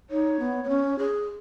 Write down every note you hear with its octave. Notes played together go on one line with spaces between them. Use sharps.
D#4 C#5
B3
B3
C#4
G#4